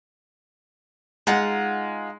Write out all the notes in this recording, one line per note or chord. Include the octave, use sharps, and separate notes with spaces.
G#3 D#4 F4 F#5